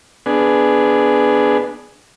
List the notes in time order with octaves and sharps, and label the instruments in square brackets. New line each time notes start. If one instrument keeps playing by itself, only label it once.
[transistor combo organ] B3 D4 G#4